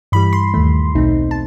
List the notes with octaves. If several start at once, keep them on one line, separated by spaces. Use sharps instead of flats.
G2 E3 G3 B5
C6
D#2 D#3 A3
B1 B2 A3 C4 D#4
A5